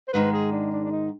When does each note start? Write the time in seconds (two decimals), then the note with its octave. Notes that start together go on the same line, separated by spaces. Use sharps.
0.08 C5
0.13 G#2 D#3 G#3 B4
0.33 G#4
0.52 D4
0.72 D4
0.84 D4
0.92 D#4